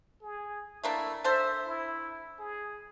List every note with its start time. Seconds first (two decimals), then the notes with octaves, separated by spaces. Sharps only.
0.22 G#4
0.84 A3 A#3 D4 E4
1.24 D4 A4 C5 E5
1.66 E4
2.39 G#4